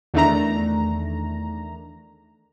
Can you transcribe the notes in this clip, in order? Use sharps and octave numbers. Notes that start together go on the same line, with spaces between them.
E2 D#3 A3 D4 A#5